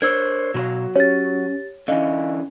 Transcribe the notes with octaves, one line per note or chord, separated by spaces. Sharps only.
D4 A#4 C5 C#5 E6 G#6
B2 F#3 B4 F5
C#4 G4 C#5 A6
D3 E3 C#4 D#5 F5